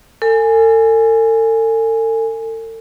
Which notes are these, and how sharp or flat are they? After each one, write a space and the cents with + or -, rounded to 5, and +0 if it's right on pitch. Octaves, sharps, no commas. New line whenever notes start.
A4 +40 G#5 +0